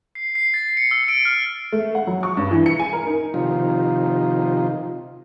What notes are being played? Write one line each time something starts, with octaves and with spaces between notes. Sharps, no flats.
C7
C7
A6
C#7
E6
D7
F6
A3
F#5
F#3
C#6
G2
E3
C#7
G#5
A#4
D#4
C3 D#3 F3 D#4 F4